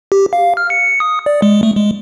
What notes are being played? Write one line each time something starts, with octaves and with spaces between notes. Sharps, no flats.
G4
F5
F6
C#7
D#6
D5
G#3
A3
G#3